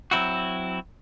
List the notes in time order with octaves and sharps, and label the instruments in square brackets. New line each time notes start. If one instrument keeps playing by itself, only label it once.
[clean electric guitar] F#3 C4 E4 F#4